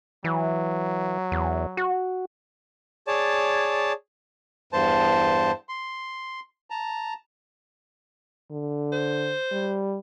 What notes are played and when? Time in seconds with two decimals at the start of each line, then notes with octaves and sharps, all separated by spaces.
0.24 E3 F#3
1.32 E2
1.77 F#4
3.07 G#4 C#5 D5 A5
4.73 E2 G2 C5 A5
5.69 C6
6.70 A5 A#5
8.51 D3
8.92 C5
9.52 G3